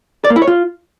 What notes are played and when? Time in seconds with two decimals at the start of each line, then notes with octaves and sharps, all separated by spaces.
0.24 D5
0.30 A#3
0.36 E4
0.42 C#5
0.47 F4